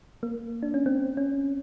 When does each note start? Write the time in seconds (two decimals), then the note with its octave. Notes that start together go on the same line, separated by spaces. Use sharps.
0.23 A#3
0.63 D4
0.74 C#4
0.86 C4
1.17 C#4